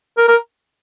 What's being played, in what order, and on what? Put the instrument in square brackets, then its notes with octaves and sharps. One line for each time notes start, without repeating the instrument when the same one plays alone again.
[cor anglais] A#4
A#4